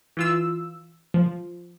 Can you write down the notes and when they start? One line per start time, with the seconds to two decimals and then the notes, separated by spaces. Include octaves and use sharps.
0.17 E3 F4 E6
1.14 F3